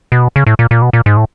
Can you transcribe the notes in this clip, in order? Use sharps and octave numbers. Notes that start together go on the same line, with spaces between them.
B2
C#3
A2
A#2
A#2
B2
A#2
G#2
A2